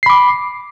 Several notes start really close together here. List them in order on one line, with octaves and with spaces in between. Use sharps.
C7 B5 D6